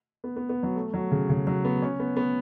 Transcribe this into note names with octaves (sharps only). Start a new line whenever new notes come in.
B3
B3
B3
F#3
A3
F#3
C#3
C#3
F#3
B3
C#4
B3
B3